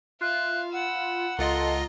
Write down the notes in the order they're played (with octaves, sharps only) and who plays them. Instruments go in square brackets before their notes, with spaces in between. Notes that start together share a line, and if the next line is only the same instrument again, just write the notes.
[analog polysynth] F4 [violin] E5 F5 [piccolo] F#6
[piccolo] F#5 [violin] B5 E6
[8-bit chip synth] C#2 F4 D#5 [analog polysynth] A4 [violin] A#5 C6